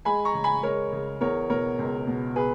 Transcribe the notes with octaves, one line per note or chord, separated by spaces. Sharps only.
G#3 G#5 B5
A#5 C#6
C#3
G#5 B5
G#3 A#4 C#5
C#3
E2 A#4 C#5
B2 A#4 C#5
C#2
B2
G#4 B4